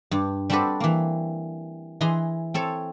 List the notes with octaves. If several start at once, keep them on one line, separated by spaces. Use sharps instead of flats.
G2
G3 C4 D4 F#4 A4 B4
E3 A#3
E3 G#4 D#5 C6
C4 A4 C#5